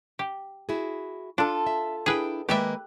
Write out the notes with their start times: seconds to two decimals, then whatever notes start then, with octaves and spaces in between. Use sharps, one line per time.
0.19 G4
0.69 E4 F#4 G#4
1.38 D4 F4 A4
1.67 E5
2.06 D4 E4 G#4 B4 G5
2.49 D#3 G#3 A#3 G4 B4 D5 E5